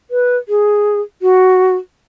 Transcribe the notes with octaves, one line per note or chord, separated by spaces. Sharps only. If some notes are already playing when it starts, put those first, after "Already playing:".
B4
G#4
F#4